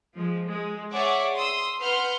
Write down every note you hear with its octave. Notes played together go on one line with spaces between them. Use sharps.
F3 G#3
G#3
G#4 C#5 D5 E5 F#5 D6
C6 D#6 E6
B4 F#5 C6 F6 G6